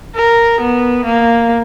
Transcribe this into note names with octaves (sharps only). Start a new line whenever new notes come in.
A#4
B3
A#3